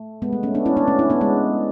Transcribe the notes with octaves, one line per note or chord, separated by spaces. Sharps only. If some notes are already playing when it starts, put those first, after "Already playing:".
Already playing: A3
G#3 B3
A3
A3 C#4
B3 D4
C#4 E4
B3 D4
A3 C#4
C#4 E4
B3 D4
G#3 B3